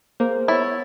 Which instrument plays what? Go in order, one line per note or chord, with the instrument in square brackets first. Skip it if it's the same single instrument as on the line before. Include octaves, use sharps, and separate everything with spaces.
[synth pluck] A#3 [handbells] G#4 A#4 C5
[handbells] B3 A6 [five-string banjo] E4 [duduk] C#5